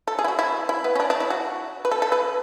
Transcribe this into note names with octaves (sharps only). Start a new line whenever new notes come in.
A4
G#4
E4
F#4
E4
E4
B3
C#4
D4
D4
E4
F#4
B4
A4
A4
B4